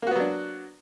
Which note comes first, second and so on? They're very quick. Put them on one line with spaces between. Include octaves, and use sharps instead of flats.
A#3 F#4 B3 F#3 D4